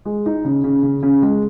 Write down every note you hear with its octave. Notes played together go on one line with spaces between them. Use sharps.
G#3
D#4
C#3
C#3
C#3
C#3
G#3